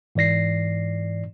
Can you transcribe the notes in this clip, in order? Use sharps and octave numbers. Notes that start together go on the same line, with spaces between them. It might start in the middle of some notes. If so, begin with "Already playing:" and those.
G#2 E3 D5 A#6 C7